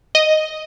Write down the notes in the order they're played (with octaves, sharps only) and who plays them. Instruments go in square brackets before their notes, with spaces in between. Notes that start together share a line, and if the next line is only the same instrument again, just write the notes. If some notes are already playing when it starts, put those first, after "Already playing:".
[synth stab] D#5